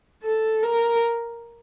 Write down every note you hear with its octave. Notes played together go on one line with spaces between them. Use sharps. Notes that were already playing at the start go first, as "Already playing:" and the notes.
A4
A#4